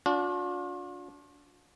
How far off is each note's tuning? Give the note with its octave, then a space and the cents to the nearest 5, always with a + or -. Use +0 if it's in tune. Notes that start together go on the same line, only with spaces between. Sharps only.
D4 -25 F4 +45